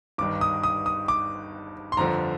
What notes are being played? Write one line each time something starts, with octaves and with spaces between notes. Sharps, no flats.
G1 G2 D#3 D6
D#6
D#6
D#6
D6
C6
G1 F2 D3 F3 A#5